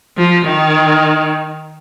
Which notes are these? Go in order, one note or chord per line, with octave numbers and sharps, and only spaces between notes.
F3
D#3